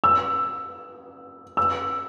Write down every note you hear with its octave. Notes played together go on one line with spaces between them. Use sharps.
E6
E6